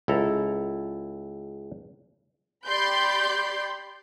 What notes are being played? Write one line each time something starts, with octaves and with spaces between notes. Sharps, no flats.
C#2 E4 A4 A#5
G4 D5 B5 C6 G6